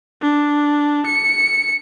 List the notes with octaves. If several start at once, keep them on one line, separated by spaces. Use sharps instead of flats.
D4
C#7